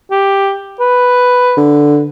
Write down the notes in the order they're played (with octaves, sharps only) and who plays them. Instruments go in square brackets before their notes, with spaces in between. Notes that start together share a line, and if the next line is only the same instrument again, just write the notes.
[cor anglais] G4
B4
[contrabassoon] D3